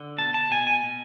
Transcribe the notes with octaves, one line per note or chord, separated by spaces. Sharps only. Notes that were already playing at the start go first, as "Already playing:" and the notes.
Already playing: D3
B2 A5
A5
B2 G#5
G#5
B2